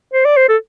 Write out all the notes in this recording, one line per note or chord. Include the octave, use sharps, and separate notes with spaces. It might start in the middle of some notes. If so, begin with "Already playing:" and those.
C5
D5
C5
A4